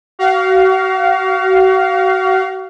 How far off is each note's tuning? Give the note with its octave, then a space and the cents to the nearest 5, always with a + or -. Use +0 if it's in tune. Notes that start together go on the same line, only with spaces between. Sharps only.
F#4 +35 F5 +0